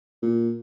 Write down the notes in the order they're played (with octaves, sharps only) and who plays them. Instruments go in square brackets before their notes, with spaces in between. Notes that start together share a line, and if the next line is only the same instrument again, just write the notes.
[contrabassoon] A#2